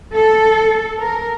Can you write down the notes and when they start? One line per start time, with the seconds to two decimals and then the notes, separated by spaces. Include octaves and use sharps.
0.15 A4
1.00 A#4